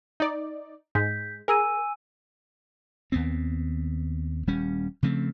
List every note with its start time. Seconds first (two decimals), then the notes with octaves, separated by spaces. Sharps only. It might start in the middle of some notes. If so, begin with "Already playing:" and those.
0.20 D#4 D5
0.95 G#2 G#3 G6 B6
1.48 G#4 A#4 G#5 E6 D#7
3.12 D#2 B3 C4
4.47 D#1 G3 C#4
5.03 C#3 F3 A3 C4